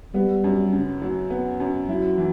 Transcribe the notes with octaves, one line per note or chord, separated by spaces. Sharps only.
G3 B3
F#2
C#3
F#3
B3
F#2
F#3 E4
E3